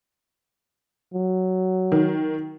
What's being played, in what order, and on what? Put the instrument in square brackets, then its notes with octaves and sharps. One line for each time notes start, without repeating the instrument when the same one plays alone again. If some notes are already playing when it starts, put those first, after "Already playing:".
[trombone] F#3
[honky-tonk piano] D#3